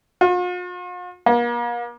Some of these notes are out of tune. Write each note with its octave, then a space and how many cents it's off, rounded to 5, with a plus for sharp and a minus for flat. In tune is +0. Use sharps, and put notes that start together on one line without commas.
F4 +45
A#3 +40